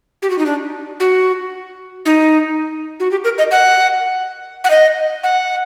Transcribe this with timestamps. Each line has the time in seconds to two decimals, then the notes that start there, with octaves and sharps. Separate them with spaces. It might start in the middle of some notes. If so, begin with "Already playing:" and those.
0.22 G4
0.30 F#4
0.39 D#4
0.46 D4
1.00 F#4
2.06 D#4
3.00 F#4
3.11 G4
3.24 A#4
3.38 D#5
3.51 F#5
4.64 F#5
4.70 D#5
5.23 F#5